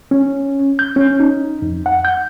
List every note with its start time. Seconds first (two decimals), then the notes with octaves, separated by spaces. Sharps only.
0.11 C#4
0.79 G6
0.96 C#4
1.20 D#4
1.62 F2
1.86 F#5
2.05 G6